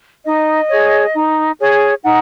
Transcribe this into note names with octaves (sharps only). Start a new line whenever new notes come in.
D#4 D#5
G#4 C#5
D#4
G#4 C#5
D#4 F#5